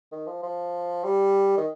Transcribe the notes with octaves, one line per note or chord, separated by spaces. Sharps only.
D#3
F3
F3
G3
D#3